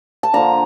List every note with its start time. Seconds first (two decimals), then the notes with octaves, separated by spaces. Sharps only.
0.23 A5
0.33 D3 F3 A#3 D4 A#5